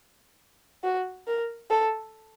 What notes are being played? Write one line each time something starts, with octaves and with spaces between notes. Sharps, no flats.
F#4
A#4
A4